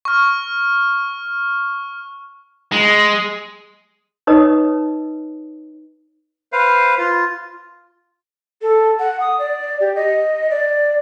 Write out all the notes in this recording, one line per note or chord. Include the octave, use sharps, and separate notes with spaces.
C#6 F6
G#3
D#4 B4 C#5 D#5 D#6
B4 C5 F5
F4
A4
F#5
D#6
D5
G4
D#5
D5